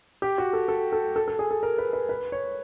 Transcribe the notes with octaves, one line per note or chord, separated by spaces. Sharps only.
G4
F#4
A4
A4
A4
A4
A4
G#4
A4
A#4
B4
B4
B4
C#5